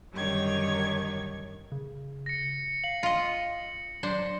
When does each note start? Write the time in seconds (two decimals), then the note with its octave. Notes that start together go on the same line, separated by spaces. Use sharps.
0.13 F#2 D3 D#3 G3 C#5 G#6
1.72 C#3
2.26 A#6 C#7
2.84 F5 F#7
3.03 F4 D#5
4.03 F#3 D4 C5